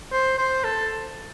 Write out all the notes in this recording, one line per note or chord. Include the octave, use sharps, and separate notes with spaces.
C5
C5
A4